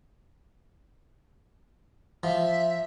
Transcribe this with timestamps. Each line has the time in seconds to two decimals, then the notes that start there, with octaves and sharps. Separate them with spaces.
2.23 F3 E5